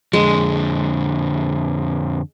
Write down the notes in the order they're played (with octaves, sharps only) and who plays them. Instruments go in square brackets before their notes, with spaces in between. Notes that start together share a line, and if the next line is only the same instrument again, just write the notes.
[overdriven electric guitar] F2 D3 [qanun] G#3